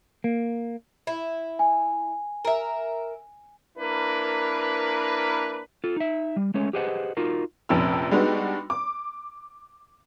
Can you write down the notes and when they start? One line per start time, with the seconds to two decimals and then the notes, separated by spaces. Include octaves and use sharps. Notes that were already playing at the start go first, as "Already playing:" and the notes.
0.24 A#3
1.07 E4
1.59 G#5
2.45 A#4 E5
3.78 A#3 D4 E4 A#4 B4
5.84 F4 A4
5.96 D#4 E5
6.36 G3
6.54 G#3 A3 C#4 C#5
6.73 G4 G#4 B4 C5 D#5 F#5
7.17 D#4 F4 F#4 A#4
7.69 F1 A#1 F2 C#4 E6
8.11 G3 G#3 B3 D4 D#4 F#4
8.70 D6